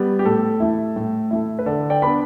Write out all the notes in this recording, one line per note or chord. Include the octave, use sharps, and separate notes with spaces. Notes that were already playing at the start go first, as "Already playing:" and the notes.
Already playing: G3 B3
G4
A2 A4
A3 E4
A2
A3 E4
B4
D3 A4 D5
D5 G5
B3 D4 B5